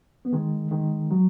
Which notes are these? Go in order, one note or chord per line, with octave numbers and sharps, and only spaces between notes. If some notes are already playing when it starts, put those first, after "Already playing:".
B3
D#3 G#3
D#3 G#3
F#3